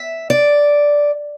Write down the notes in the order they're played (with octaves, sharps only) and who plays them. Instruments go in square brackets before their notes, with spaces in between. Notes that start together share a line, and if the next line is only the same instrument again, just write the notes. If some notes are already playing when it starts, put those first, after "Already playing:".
Already playing: [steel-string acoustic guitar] E5
D5